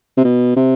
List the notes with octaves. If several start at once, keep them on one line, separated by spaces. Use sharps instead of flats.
C3
B2
C3